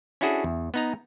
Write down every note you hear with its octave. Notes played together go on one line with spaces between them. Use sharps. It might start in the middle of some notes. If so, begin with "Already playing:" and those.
C#4 D4 E4 F#4 G#4 A4
E2
B3 D#4 A#5